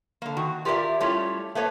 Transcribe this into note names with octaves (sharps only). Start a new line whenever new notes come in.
D3 A#3
D#3 F#4
F4 G4 A#4 C#5 D5 E5
G3 A3 C#4 E4 F4 G4
A3 A#3 B4 C#5